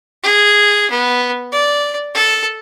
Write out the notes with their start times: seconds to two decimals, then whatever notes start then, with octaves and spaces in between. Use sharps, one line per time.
0.24 G#4
0.90 B3
1.52 D5
2.15 A4